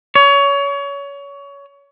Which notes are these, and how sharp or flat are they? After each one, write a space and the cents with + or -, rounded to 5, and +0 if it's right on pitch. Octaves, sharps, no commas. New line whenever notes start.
C#5 +25